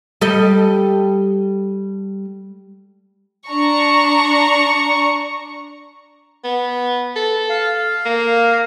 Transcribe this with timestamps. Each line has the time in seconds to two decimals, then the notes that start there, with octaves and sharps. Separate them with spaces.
0.21 G3 A4 D#5
3.47 D4 A#5 C#6
6.44 B3
7.16 A4
7.50 F5
8.06 A#3